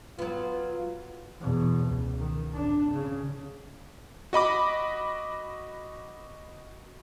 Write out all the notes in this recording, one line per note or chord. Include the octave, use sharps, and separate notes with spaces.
F#3 B3 F4
E2 B2
C#2
D#3
G#1 D4
C#3
F#4 D#5 B5 D6